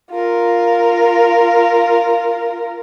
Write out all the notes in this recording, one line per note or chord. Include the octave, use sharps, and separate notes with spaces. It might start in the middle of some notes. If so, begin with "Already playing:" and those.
F4 A#4